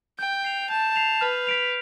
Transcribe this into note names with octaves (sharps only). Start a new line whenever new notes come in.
G5 G6
C7 F7
A5 G6
C7 F7
B4 F6
B6 D7 F7